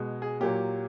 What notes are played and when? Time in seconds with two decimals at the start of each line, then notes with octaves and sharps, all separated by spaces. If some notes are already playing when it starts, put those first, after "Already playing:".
Already playing: B2 G#3
0.22 G#4
0.40 A#2 F#3 A#3 G4